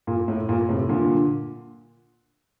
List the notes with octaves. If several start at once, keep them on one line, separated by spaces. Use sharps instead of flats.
A#2
A2
A#2
A2 C3
A#2 D3